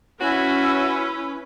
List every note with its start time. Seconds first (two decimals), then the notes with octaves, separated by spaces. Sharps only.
0.21 C#4 E4 F#4 B4